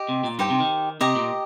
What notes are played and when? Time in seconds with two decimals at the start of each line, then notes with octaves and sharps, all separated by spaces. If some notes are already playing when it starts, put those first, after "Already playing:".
Already playing: G4 D#5 G5
0.09 C3
0.24 A#2
0.39 G2 D#4 G4 C5 G5
0.50 C3
0.60 D#3
1.01 C3 G4 D#5 A#5
1.16 A#2